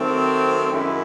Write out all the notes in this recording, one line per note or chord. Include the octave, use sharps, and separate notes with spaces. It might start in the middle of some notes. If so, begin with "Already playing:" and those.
Already playing: D#3 F#3 A3 C4
F#2 D#3 G#3 C#4 E4